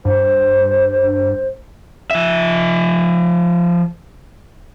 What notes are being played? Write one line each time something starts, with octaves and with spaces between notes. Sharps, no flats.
G2 C5
F3 E5